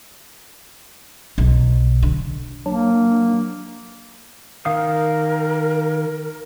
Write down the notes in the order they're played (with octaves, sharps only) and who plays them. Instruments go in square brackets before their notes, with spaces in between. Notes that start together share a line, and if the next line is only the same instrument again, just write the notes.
[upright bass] B1
D3
[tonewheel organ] F#3 D4 [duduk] A#3
[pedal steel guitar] D#3 F5 D#6 [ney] A#4